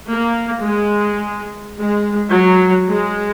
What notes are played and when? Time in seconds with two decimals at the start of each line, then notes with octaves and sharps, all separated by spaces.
0.11 A#3
0.66 G#3
1.78 G#3
2.33 F#3
2.89 G#3